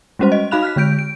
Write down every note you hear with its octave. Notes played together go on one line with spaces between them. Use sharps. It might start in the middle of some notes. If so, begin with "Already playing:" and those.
G3 G#3 C#4 F#4 C5
D#5
D#4 F#4 F5 B5 F#6 F7
F6 F#6 B6
D3 G#3 G6 D7
D7